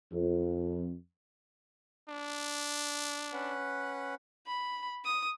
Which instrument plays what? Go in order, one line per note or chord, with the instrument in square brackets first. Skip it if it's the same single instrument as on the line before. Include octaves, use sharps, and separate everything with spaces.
[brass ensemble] F2
[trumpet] D4
[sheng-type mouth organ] C#4 B4 F#5
[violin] B5
D#6